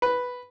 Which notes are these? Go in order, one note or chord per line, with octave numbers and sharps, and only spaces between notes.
B4